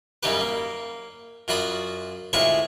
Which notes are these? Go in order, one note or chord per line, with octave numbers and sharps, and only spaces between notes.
F#2 C#3 G3 D#4 G4 B4
A#3
F#2 F4 F#4 D5 B5 D#6
D2 G#3 E4 F4 C#5 C#6